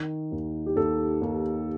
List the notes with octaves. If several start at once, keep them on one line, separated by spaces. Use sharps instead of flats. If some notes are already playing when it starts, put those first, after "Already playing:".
Already playing: D#3
D#2
G4
D#2 A4
D#2